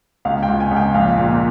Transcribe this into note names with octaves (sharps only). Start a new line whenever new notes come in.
C#2 F5
G5
C#2
G#5
C#2
G5
A#1 F5
A#2